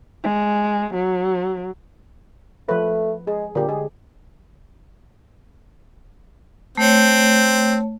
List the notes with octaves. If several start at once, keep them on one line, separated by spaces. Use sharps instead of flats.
G#3
F#3
F3 A3 B4
G#3 G#4
A#2 D3 G4
G#3 G#4
A3 C4 C#5